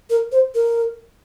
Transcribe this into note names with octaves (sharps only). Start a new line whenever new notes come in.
A#4
C5
A#4